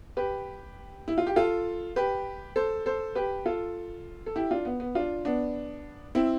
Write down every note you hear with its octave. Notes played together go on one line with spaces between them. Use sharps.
G4 B4
E4
F4
G4
F4 A4
G4 B4
A4 C5
A4 C5
G4 B4
F4 A4
A4
E4 G4
D4 F4
B3
B3
D4 F4
B3 D4
C4 E4